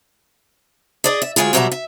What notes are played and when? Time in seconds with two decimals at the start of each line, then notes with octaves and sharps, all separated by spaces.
1.04 G#4 D5 D#5
1.22 E5
1.36 D2 G2 G#3 F4 G#4
1.53 B2 F#3 G3 D5 E5 A#5
1.72 E5